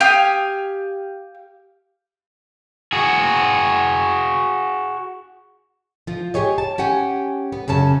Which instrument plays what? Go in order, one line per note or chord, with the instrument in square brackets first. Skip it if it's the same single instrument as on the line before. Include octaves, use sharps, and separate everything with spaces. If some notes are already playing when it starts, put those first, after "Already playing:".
[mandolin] G4 F5 G#5 D#6
[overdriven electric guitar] F#4 G#4
[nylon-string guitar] F3 F4
G4 G#4 C#5 D#5
A5
C#4 G4 F#5 G#5
B3
F#2 C#3 C#4 A5